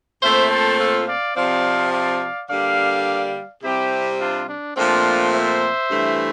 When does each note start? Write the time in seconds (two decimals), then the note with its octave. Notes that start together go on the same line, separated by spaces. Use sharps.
0.22 A#2 A3 C4 C5 E5
0.51 A4 C5
0.80 F4 A4
1.08 D5 F5
1.36 C3 F3 C4 D5 F5
1.93 D5 F5
2.50 D3 G3 A#3 D5 F5
3.63 C3 G3 C4 E4 G4
4.20 D4 F4
4.48 D4
4.77 A#2 F3 A3 C4 D4 F4
5.34 C5 E5
5.91 G2 E3 A3